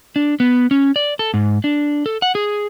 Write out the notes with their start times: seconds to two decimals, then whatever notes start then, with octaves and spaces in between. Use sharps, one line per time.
0.16 D4
0.40 B3
0.71 C#4
0.96 D5
1.19 A4
1.34 G#2
1.64 D4
2.06 A4
2.22 F#5
2.35 G#4